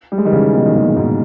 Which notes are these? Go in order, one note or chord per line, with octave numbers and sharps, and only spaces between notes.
G3
G#3
D#3 G3
C#3 E3
B2 D#3
D#3
A#2 C#3
C#3
G#2 B2